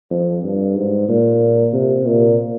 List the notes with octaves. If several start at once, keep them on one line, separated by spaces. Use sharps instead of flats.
F2
G2
G#2
A#2
C3
A#2